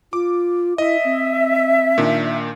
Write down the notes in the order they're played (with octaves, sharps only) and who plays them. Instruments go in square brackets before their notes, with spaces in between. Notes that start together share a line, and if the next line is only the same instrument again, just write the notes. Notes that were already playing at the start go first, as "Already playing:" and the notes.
[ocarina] F4 [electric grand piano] D6
[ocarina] E4 [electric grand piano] D#5 D#6 [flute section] E5
[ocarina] C4
[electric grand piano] A#2 D#3 D4